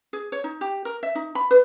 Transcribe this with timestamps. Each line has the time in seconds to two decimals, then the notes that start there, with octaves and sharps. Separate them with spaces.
0.13 G#4
0.32 C#5
0.44 D#4
0.61 G4
0.85 A#4
1.03 E5
1.15 D#4
1.35 B5
1.51 B4